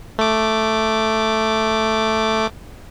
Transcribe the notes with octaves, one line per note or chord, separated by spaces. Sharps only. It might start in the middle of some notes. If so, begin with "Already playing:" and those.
A3 D6